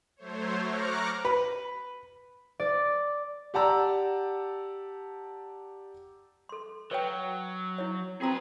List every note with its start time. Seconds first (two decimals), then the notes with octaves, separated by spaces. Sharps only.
0.16 F#3 A3 C5 C#5
0.60 A#5 C#6 D6 F6 F#6
1.25 B4
2.60 D5
3.54 G4 D5 F#5 A5 A#5 E6
6.49 A4 C6
6.91 F#3 B4 C#5 G5
7.78 E4 C#5
8.22 C4 F4 F#4 G#4 B4 A#5